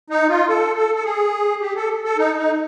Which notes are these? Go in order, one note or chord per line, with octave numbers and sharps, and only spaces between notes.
D#4
F4
A4
A4
A4
G#4
G4
A4
A4
D#4
D#4